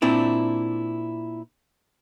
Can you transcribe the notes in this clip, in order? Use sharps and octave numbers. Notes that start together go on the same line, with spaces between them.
A#2 C4 D4 E4